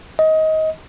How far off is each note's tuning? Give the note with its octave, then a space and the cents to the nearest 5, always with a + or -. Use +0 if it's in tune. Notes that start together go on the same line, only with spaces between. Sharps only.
D#5 +20